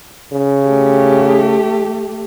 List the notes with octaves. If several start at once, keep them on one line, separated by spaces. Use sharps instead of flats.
C#3
A3 G4